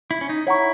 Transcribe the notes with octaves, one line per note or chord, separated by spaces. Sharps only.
E4
C#4
D#4
E4 C#5 F#5 A#5 C#6